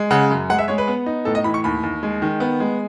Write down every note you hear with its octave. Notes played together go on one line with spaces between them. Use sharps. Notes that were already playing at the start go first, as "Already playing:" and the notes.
Already playing: G#3
C#3 F#5
F#2
G#3 F#5
E5
G#3 C#5
B4
B3
D#4
A2 A4
D#5
E3 B5
C#6
D#2 B5
D#2
G#3
D#3
B3
G#3